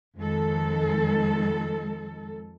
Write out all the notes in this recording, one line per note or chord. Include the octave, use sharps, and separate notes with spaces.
F2 D#3 G#3 A4